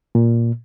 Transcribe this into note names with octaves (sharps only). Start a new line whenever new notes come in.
A#2